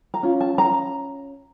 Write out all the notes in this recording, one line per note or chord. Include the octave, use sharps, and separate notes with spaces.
A#5
C#4 F4
A5
A#5